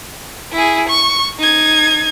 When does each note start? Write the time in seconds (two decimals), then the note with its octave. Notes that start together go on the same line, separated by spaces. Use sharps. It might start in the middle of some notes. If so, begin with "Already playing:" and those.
0.52 E4 G#4
0.89 C#6
1.39 D#4 G#6